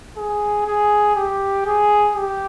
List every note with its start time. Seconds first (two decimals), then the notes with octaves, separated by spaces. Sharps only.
0.17 G#4
0.67 G#4
1.16 G4
1.66 G#4
2.16 G4